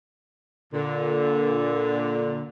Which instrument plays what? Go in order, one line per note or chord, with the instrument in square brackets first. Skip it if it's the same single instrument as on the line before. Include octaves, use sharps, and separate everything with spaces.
[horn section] A#2 D3